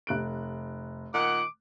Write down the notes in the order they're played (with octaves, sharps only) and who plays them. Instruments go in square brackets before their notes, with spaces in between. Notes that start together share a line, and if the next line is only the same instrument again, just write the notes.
[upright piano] F1 F#6 D7
[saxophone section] A#2 D#3 F#5 [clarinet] D6